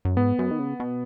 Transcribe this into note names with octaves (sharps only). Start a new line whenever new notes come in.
F#2
G#2 B3
F#2
D#3
C#3
B2